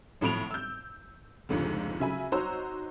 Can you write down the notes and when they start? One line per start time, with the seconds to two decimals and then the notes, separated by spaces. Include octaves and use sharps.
0.21 G#1 A2 F3 B5 D7 F7
0.51 E6 G6
1.49 F1 C#2 G#2 D3
1.99 C#3 F#3 E5 G#5 B5
2.32 D#4 F#4 C5 C#5 A#5 E6